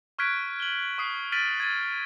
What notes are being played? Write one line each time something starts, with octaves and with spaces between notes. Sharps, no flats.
C#6 F6 F#6 G#6 B6 D7
F#7 G7
C#6 D#6 C7
F6 A6 B6 D7 D#7 F#7
G#6 A6 D#7